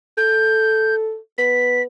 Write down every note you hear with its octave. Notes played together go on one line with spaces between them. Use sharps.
A4 G6
B3 B6